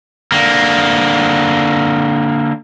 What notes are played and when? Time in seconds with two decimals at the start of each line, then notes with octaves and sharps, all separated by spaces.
0.32 D3 A#3